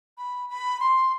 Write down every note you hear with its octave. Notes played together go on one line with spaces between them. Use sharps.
B5
B5
C6